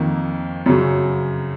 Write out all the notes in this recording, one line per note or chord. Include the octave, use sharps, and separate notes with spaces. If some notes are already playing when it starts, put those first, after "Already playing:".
Already playing: F2 D#3 A#3
F#2 C#3 F#3